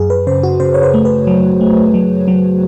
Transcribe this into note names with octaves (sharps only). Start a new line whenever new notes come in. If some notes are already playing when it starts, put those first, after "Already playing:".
Already playing: F#2 G#4
B4
C#3 C5
F#4
C#3 C5
C#5
C5
A3
B4
F#3
A3
F#3
F#3